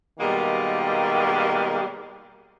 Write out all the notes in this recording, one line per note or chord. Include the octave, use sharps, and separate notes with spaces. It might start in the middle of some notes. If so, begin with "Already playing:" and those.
B2 D#3 G3 G#3 A#3